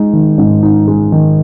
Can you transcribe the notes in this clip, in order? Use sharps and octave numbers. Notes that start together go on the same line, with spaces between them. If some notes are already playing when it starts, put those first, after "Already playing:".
Already playing: G#3 D#4
D#3
G#2
D#4
G#3
D#3